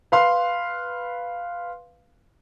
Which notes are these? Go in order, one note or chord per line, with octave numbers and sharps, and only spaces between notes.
B4 F5 C6